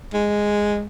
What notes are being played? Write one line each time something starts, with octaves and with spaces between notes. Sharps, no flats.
G#3